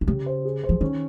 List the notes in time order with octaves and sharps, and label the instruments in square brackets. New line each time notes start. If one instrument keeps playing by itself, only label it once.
[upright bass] C3
[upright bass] C#3 [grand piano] G4
[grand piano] C5
G#4
C5
[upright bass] F3
[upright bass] D#3 [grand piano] C#4